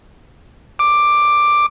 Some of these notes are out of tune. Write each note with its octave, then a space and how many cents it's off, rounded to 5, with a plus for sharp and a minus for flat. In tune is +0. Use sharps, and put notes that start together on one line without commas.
D6 +10